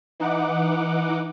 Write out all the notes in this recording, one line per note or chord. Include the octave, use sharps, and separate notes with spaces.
E3 D#4 F#5 D6